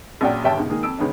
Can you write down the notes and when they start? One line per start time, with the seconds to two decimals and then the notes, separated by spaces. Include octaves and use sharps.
0.21 A#1 F#2 A#2 F#4 D5 G5
0.44 G1 D#2 C#5 E5 G5 A5
0.57 C#2 B2 D#3
0.70 D#3 G#3 A#3 G#4
0.83 F2 E6 D7
0.98 C#2 D#3 G#3 B3 C#4